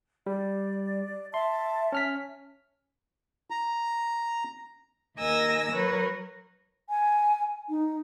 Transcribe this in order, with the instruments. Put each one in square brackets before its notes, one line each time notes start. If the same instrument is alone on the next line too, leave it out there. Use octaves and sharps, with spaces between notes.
[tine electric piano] G3 [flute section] D5
[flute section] E5 A5 [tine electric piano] C6
[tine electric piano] C#4 F6 B6
[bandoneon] A#5
[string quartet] D#2 A#4 D#5 G#5 E6 A#6
F#3 A#4 B4 C#5
[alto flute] G#5
D#4